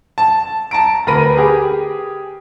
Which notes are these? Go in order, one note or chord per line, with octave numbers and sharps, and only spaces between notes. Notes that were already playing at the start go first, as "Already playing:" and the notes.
A5
A5 A#5 D7
D2 A#4 B4 B5 A#6 D#7
G4 G#4